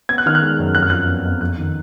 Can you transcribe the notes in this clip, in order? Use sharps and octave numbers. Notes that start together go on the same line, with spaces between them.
B3 G#6
F#6
D#3 F6
F#6
G#3
F#2
F2 F#6
F6
F3 F#6
B3
F2
F2 F#6
D#3